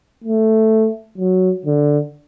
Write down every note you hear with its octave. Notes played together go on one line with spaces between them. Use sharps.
A3
F#3
D3